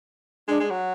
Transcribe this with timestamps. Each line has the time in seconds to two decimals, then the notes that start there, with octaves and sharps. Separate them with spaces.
0.48 G#3 D4
0.60 G#3
0.70 F#3